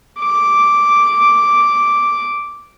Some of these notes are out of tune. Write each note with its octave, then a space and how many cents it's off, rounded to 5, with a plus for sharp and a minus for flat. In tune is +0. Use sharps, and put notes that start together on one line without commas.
D6 -5